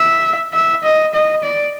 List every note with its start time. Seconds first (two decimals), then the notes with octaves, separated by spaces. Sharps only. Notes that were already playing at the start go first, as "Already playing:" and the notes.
Already playing: E5
0.53 E5
0.83 D#5
1.14 D#5
1.43 D5